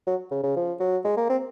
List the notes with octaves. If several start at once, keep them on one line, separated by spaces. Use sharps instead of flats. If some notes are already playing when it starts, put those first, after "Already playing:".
F#3
C#3
C#3
F3
F#3
G#3
A#3
C4